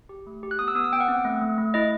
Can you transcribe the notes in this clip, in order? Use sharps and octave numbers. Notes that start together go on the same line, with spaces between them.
G4
A3
G4
F#6
B3 D#6
E6
B3 D#6
E6
B3 G5
F#5
C4
A3
A3
A3
E4 D#5